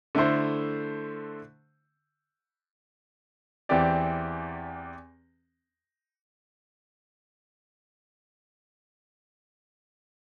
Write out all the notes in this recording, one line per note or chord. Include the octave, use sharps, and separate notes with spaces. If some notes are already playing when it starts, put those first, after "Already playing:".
D3 A3 E4 C5
E2 E3 C4 G4 D5